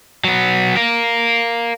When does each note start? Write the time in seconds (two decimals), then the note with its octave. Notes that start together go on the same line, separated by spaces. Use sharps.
0.24 F#3 B3
0.77 A#4 F5